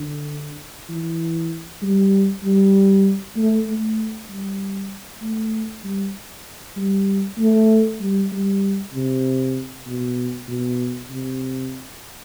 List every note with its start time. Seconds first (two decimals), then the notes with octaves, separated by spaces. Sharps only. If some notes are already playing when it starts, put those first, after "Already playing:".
Already playing: D3
0.89 E3
1.82 G3
2.44 G3
3.36 A3
3.67 A3
4.29 G3
5.22 A3
5.84 G3
6.77 G3
7.39 A3
8.00 G3
8.32 G3
8.94 C3
9.87 B2
10.48 B2
11.11 C3